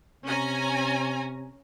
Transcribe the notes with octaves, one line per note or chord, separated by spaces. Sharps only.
C3 C#4 G#5 A#5